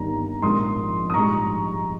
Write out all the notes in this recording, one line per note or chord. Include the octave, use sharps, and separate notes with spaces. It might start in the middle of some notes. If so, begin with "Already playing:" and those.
Already playing: G1 G2 D#3 A#3 A#5
A#1 G#2 F3 A#3 C6 D#6
D#6
A#1 G#2 G3 A#5 C#6